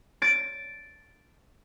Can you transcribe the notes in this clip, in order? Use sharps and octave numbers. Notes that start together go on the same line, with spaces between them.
A6 D7